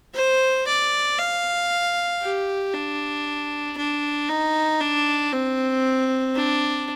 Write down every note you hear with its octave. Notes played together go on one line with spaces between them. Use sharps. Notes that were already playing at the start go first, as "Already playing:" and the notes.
C5
D5
F5
G4
D4
D4
D#4
D4
C4
D4